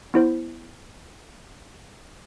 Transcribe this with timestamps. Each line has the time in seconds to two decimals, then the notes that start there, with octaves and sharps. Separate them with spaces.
0.14 B3 E4 C5